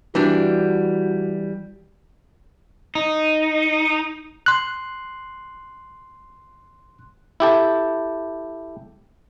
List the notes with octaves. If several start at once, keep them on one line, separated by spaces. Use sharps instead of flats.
E3 G3 D4 F#4
D#4
C6 F#6
E4 G4 A4